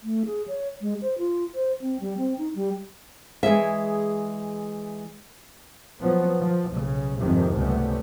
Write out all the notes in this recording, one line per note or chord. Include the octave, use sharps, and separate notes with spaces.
A3
G#4
C#5
G#3
C5
F4
C5
C4
G3
C4
D#4
G3
E3 G#3 G#4 E5
F3 F#3 B3
F3
B1 C#3
G#1 F2 G#2 C3 D#3 F3
C#2 C3 G3 A3 B3